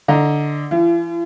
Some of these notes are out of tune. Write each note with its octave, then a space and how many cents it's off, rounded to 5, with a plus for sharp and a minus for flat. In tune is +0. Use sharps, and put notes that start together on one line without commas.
D3 +0 D#5 +15 A#5 +0
E3 +40 F4 -45